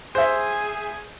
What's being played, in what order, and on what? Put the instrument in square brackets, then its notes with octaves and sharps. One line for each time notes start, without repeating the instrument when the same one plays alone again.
[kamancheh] G#4 G#5 [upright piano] C5 E5